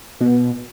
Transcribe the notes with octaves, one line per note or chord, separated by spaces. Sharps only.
B2